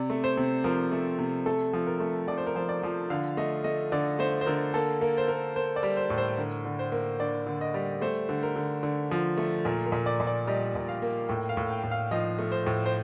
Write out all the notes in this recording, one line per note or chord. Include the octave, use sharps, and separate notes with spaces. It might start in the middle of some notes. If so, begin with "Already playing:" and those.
Already playing: C3 D5
A3
C5
C3
F3 A#4
A3
C3
A3 A4
F3
A#4
A3
F3 D5
C5
A#4
F3 C5
D5
F3
D3 F5
A3 D#5
A3 D#5
D3 D5
A3 C5
C5
D3 A#4
A#3 A4
A#3 A#4
C5
A#3 A#4
A#3 C5
D5
G3
C5
A2
C5
D3 A#4
D3
C5
A#3
D3 D5
D3
D#5
G3
A3 C5
D3
A#4
D3
D3
F3
A3
A#2 A#4
A#4
A#2
D5
A#2
D5
G3 D#5
A#2
F5
A#3
A2 G5
F5
A2
G5
A2
F5
F3 D#5
A3
C5
A2
C5